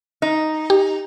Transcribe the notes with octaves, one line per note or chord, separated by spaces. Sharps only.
D#4
G4